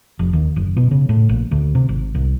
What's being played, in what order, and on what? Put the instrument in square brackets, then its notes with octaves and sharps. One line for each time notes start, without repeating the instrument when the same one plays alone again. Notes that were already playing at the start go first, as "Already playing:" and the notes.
[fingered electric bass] F1
D#2
F#1
B2
C#3
A2
A#1
D2
C3
G#1
C2